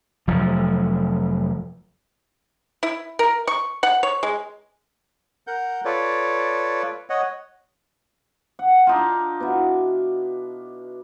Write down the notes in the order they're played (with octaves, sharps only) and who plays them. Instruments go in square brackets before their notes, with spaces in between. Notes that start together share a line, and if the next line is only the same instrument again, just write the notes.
[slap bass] F1 F3 F#3
[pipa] E4
A#4
C#6
F#5
C#5
G#3
[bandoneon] A#4 F#5 G6
F4 A4 B4 C#5 D5
C#5 D#5 F#5
[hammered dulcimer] F#5
D4 D#4 F4
B2 E4